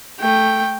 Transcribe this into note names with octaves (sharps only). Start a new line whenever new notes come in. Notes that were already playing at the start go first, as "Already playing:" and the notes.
A3 G5